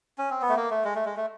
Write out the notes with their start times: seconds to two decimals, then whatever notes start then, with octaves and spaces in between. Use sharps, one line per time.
0.18 C#4
0.30 C4
0.42 B3
0.49 A3
0.57 A#3
0.71 A3
0.84 G#3
0.95 A3
1.05 G#3
1.16 A3